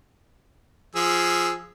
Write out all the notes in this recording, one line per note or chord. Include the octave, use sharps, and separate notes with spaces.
F3 G#4 E6